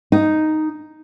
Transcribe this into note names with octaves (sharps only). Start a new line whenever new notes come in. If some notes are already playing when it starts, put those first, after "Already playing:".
D#4